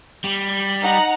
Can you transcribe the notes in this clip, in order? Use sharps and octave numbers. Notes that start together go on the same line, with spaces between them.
G3
D#4 F#5 A#5